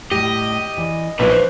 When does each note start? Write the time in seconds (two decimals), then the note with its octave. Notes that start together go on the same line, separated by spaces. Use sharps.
0.11 A2 G3 G4 D#5
0.78 E3 D5
1.19 B1 A#2 E3 F3 D4 B4
1.31 C5